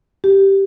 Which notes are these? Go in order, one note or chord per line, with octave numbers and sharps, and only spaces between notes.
G4